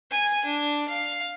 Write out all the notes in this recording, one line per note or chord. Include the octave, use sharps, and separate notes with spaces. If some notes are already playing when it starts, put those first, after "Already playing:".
G#5
D4
F5